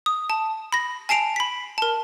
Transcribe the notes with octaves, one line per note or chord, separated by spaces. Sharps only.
D#6
A5
B5 A#6
G#5 A5 C7 D7 F7
B5 B6
A#4 A5